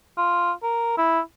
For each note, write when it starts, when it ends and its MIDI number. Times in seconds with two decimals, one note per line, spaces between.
0.18 0.52 65
0.63 0.95 70
0.98 1.20 64